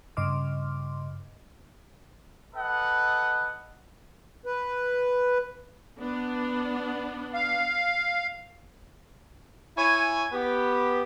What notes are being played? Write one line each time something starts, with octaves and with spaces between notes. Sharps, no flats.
G2 C#3 D#5 C6 D6 F6
A4 B4 D#5 F#5
B4
B3 D4
F5
E4 C#5 G#5
B3 G4